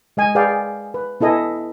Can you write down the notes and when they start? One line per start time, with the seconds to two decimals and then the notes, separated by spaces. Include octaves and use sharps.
0.17 G#3 D#5 G#5
0.35 G#4 B4 D5 F5 G5
0.94 B4
1.21 B3 E4 A4 D#5 G#5